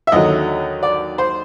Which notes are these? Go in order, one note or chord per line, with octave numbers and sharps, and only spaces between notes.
E5
D#2 D3 F#3 D#5
D5
C5